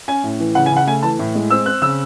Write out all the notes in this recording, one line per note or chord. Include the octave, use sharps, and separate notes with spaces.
C#4 G#5
A2
E3
C#3 F#5
G#5
C#3 F#5
A3 G#5
E3 A5
A2
G#3
C4 E6
C4 F#6
C#3 E6